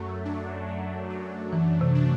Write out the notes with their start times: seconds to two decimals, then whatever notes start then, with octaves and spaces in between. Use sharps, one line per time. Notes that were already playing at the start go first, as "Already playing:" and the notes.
Already playing: F#2 F#3 A3
0.25 D4
0.69 A3
1.10 F#3
1.53 F#2 E3
1.81 C3
1.95 D4